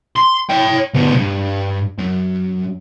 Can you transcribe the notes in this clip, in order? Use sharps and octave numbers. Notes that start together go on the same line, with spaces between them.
C6
C#5 G5
D2 B3
C2 G2
F#2